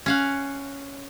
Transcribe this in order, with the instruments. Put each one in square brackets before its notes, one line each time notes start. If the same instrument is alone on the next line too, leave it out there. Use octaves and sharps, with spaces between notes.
[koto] C#4 F5 F#5